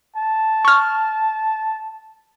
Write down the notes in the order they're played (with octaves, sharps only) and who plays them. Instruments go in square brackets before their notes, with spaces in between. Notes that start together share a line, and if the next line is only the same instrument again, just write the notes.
[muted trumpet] A5
[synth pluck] C#6 F6